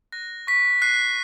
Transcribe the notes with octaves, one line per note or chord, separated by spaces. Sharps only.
F#6 A#6
C#6 B6
F#6 C7